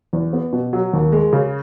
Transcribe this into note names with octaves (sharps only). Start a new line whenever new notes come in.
E2
B3
B2
F#3
D#2
G#3
C#3